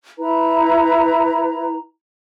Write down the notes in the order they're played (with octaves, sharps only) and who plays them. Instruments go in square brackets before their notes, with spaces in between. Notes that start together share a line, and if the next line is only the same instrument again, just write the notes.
[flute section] E4 B4 A#5